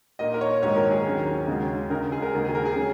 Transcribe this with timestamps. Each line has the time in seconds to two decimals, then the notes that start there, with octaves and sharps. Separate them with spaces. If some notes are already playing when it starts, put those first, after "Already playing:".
0.19 A#2 A#3 D#4 D#5
0.34 A#4
0.41 C#5
0.62 G#2 D#3 F#3 A#3 D#4 C#5
0.77 A#4
0.91 G#4
1.05 D#2 D#3 F#3 C#4
1.47 D#2 C#3 G#3 C#4 F#4
1.90 C#2 C#3 G#3 A#4
2.12 G#4
2.22 A#4
2.33 D#2 C#3 A#3 F#4 G#4
2.44 G#4
2.55 A#4
2.65 G#4
2.76 C#3 F#3 C#4